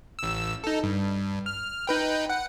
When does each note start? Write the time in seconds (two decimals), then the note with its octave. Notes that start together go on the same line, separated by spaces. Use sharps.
0.19 A1 E6
0.64 D#4 A4
0.83 G2
1.46 F6
1.87 D#4 B4 G5
2.29 F#5